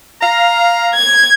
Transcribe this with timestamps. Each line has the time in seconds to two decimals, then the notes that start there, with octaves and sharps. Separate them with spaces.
0.21 F5 A#5
0.94 G#6